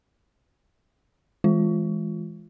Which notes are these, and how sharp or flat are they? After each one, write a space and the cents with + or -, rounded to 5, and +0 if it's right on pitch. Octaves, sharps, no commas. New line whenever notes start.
E3 -15 G#3 +0 F4 +0